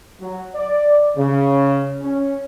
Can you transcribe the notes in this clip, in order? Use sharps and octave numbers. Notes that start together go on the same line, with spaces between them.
F#3
D5
C#3
C#4